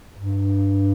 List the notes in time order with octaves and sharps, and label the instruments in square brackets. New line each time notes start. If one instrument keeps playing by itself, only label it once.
[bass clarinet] G2